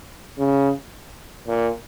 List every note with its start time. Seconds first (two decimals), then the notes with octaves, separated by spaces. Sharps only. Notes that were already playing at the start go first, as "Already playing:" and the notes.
0.38 C#3
1.47 A#2